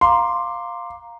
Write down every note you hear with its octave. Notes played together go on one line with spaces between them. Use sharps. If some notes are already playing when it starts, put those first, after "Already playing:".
F5 A#5 C6 D6